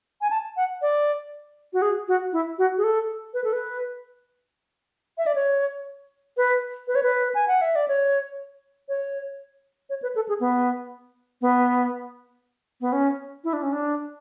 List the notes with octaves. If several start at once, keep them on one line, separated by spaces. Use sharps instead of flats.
G#5
A5
F#5
D5
F#4
G#4
F#4
E4
F#4
G#4
A4
B4
A4
B4
E5
D5
C#5
B4
B4
C#5
B4
G#5
F#5
E5
D5
C#5
C#5
C#5
B4
A4
G#4
B3
B3
B3
C#4
E4
D4
C#4
D4